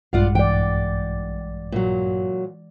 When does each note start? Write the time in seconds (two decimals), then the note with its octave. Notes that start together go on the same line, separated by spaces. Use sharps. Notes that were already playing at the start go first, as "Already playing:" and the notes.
0.13 A#1 G2 G#3 F4 D5 F5 F#5
0.35 E3 D5 G5
1.72 A#2 F#3